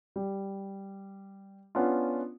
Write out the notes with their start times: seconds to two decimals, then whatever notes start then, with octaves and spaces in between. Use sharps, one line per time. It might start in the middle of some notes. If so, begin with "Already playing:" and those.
0.16 G3
1.75 B3 C#4 D4 F4